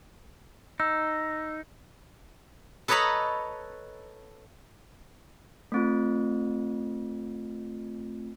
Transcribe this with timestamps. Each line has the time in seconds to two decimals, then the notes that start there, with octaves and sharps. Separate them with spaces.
0.80 D#4 E6
2.88 A4 B4 C#5 D#5 A#5 B5
5.72 A3 C4 F4